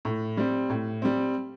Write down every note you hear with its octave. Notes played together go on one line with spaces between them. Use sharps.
A2
G3 C4
A2
G3 C4